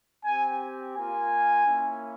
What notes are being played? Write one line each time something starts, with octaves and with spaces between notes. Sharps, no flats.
C4 G4 G#5
A#3 F4 G#5
A#3 C#4 E4